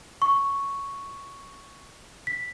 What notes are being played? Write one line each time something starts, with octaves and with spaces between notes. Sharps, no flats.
C#6
B6